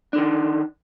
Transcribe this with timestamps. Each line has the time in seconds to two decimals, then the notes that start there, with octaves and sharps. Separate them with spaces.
0.13 D4
0.16 D3
0.18 D#3